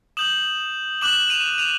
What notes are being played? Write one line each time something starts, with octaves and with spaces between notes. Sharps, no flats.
D#6 G6 E7 F#7
D6 F#6 E7 F#7
D#7 F7
D#7 F7